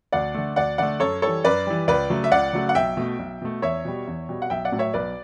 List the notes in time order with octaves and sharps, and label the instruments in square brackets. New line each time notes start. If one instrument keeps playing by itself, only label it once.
[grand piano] D2 D5 F#5
D3 A3
D2 D5 F#5
D3 A3 D5 F#5
F#2 A4 C#5
E3 G3 A4 C#5
F#2 B4 D5
E3 G3
C#2 B4 D5
C#3 F#3 A3
E5
C#2 D5 F#5
C#3 F#3 A3
F#5
B1 E5 G5
B2 A3
B1
B2 A3
E2 C#5 E5
B2 G3
E2
B2 G3
F#5
B1 E5 G5
D5 F#5
A2 F#3 A3
C#5 E5
B1 B4 D5